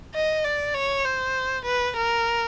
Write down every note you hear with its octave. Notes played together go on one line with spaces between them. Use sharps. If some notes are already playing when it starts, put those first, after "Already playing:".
D#5
D5
C#5
C5
B4
A#4